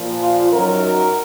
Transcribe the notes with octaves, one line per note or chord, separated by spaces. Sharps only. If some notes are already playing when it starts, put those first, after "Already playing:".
Already playing: A#2 F3
F4
F#2 D#3 F#3 A#4